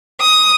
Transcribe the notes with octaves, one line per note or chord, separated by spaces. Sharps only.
D#6